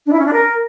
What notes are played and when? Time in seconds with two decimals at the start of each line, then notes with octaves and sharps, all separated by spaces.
0.06 D4
0.12 E4
0.19 C#4
0.26 D4
0.32 A#4